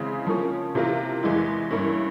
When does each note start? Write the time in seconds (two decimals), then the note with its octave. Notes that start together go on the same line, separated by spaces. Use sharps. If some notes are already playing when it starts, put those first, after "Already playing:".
Already playing: C#3 E3 G#3 C4 E4
0.27 F3 A#3 C#4
0.75 C3 E3 A#3 F4 A#4
1.23 E2 E3 G#3 E4
1.71 G2 E3 A#3 C#4 E4